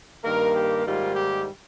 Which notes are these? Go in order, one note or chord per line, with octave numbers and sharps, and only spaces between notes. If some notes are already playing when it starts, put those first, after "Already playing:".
G2 D#3 A#3 A#4
G4
G#2 D#3 G3 A#3 F4
G4